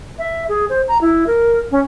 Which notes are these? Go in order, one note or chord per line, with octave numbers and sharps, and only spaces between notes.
E5
G#4
C5
A#5
E4
A#4
C#4